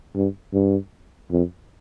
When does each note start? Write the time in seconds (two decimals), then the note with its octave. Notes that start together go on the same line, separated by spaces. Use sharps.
0.15 G2
0.53 G2
1.30 F2